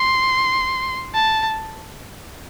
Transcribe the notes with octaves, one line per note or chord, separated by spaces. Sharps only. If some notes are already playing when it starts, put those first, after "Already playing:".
Already playing: C6
A5